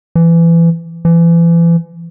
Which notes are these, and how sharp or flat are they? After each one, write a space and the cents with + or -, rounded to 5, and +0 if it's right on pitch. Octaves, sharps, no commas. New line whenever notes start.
E3 +25
E3 +35